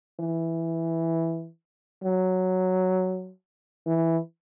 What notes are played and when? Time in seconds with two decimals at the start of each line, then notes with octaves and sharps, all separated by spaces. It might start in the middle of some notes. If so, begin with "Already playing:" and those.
0.20 E3
2.04 F#3
3.86 E3